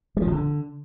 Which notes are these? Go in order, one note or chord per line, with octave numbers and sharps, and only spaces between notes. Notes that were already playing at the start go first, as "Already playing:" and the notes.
G3
F3
B2
D3